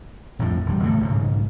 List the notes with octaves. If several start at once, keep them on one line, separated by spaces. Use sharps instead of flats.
A#1 F2 A2 F3
E1 G3
E2 A2 C#3 A3
B1 G#2 C#3